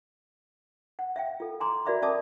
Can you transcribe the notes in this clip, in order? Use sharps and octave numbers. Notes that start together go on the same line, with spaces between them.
F#5
E5 F5 G5
F4 A4
G#5 A#5 C6 D6
F#4 A#4 D5 E5 B5 D6
C#4 D5 E5 A5 D6 D#6